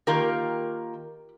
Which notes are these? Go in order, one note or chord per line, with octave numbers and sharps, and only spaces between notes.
D#3 A#3 F4 G4 A#4